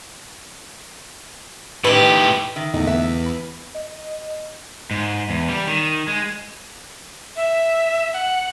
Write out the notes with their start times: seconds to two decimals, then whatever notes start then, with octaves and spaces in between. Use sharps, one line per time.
1.84 A2 D#3 G4 B4
2.56 D#3 E5
2.74 E2 A#2 D3 A3 D#4
2.87 B3 E5
3.26 B5
3.75 D#5
4.91 G#2
5.30 E2
5.49 G3
5.67 D#3
6.08 G#3
7.36 E5
8.13 F#5